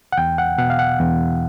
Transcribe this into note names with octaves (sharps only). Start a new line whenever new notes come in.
F#5
E2 G5
F#5
B2 F#5
F5
F#5
E2